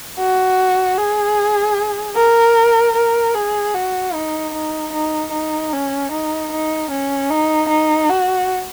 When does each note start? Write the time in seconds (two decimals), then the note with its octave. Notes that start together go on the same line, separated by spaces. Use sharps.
0.19 F#4
0.98 G#4
2.16 A#4
2.95 A#4
3.35 G#4
3.74 F#4
4.14 D#4
4.54 D#4
4.93 D#4
5.32 D#4
5.72 C#4
6.12 D#4
6.52 D#4
6.91 C#4
7.30 D#4
7.69 D#4
8.09 F#4